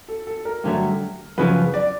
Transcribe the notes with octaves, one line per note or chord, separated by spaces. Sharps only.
A4
A4
A#4
G2 D3 F#3 A3
F#2 C#3 F3 B4
D5